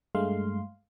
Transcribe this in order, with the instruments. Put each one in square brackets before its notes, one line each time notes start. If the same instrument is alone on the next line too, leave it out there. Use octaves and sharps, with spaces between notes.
[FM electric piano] G2 G#3 A3 F5 C6